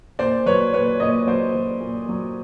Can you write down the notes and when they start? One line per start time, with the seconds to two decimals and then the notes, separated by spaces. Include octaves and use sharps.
0.19 A#2 C5 D5
0.46 F#3 B4 C#5
0.73 A#2 B4 C#5
1.00 A#2 C#5 D#5
1.27 F#3 C5 D5
1.54 F#3
1.81 A#2
2.09 F#3